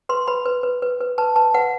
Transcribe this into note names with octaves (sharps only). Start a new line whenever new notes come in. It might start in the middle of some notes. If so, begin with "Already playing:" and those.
B4 C6
B4 B5
B4
B4
B4
B4
B4 A5
B4 A5
B4 F#5